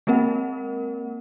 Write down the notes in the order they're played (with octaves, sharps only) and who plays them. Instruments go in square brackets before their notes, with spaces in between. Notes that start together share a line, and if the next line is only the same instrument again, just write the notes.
[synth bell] G#3 A#3 C4 A#4 F#5